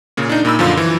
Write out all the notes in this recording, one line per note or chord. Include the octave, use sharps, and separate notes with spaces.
A#2 C#3
D4 D#4
A#2 D#4 B5 E6
F#2 D3 F3 F4
E3